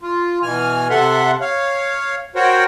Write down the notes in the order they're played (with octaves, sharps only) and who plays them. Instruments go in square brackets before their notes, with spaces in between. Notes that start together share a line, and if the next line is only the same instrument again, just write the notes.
[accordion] F4
B2 E3 G#5 F6
C3 A4 E5 F#5 C6
C#5 F5
F#4 A#4 C5 C#5 F#5 G5